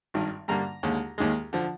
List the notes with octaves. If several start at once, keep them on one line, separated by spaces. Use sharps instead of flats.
G#1 G2 D#3
G2 D3 G3 A#3 A#5
D#2 D3 G#3
D#2 D#3 G#3
D3 F3